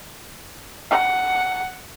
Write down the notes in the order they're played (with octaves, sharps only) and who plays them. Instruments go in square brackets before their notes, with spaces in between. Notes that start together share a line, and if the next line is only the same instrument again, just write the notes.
[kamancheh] F#5